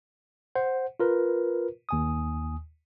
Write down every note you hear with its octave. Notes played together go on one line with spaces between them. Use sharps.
C5 F#5
F4 A#4 B4
D#2 G#5 D#6